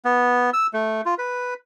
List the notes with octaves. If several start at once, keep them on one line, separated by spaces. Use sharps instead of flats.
B3
E6
A3
F4
B4